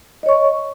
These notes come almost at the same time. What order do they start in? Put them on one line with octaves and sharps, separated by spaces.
D#5 C#5 C#6